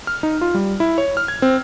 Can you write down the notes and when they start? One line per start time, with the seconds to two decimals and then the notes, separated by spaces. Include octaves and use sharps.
0.07 F6
0.23 D#4
0.41 F4
0.54 G3
0.80 E4
0.98 C#5
1.17 F6
1.28 G#6
1.42 C4